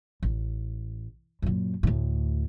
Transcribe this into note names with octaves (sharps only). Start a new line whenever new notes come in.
A1
F#2 A#2
D2 A2